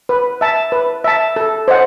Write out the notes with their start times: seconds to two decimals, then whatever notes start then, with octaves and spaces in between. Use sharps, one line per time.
0.09 B4
0.41 E5 A5
0.72 B4
1.04 E5 A5
1.36 A4
1.68 C5 D#5 F#5